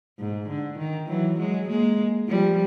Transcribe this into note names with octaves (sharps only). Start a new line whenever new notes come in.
G#2
D3
D#3
E3 F#3
F#3 G#3
G#3 A#3
F3 G3